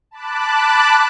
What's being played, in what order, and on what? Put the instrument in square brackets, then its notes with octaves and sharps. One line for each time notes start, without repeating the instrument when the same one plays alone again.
[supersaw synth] A5 B5 D6 F#6